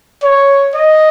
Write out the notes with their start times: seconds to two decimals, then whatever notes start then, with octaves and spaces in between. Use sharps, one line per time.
0.23 C#5
0.75 D#5